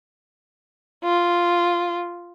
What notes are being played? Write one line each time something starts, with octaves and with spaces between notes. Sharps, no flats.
F4